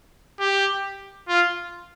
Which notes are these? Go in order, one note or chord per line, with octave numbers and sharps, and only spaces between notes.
G4
F4